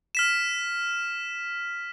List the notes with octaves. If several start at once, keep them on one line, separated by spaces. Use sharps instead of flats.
F6 B6 E7